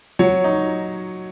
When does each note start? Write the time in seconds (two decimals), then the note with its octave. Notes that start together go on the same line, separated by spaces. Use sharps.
0.19 F#3 C#5
0.44 D#4